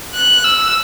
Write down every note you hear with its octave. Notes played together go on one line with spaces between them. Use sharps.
F#6
E6